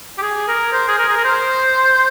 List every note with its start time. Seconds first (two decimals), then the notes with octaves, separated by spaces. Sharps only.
0.18 G4
0.22 G#4
0.48 A#4
0.73 C5
0.88 G#4
0.99 A#4
1.09 G#4
1.17 A#4
1.25 C5